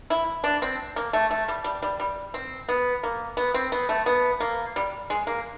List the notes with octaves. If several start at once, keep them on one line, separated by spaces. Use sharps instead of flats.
E4
D4
C4
A#3
A3
A3
G3
G3
G3
G3
C4
B3
A#3
B3
C4
B3
A3
B3
A#3
G3
G#3
A#3